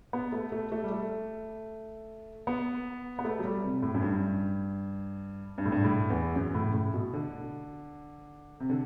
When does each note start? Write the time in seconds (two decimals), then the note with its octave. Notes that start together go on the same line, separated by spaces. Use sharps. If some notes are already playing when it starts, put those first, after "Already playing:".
0.13 B3
0.32 A3
0.52 A3
0.72 A3
0.84 G3
0.91 A3
2.47 B3
3.19 B3
3.25 A3
3.39 F#3
3.44 G3
3.64 C3
3.82 A2
3.94 F#2
4.02 G2
5.58 G2
5.66 A2
5.72 G2
5.84 A2
6.10 E2
6.36 F#2
6.55 A2
6.74 A2
6.94 B2
7.13 D3
8.60 C3
8.70 D3